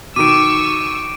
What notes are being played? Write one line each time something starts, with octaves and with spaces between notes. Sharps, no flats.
B2 D#3 C#6 D6 E6 D7 D#7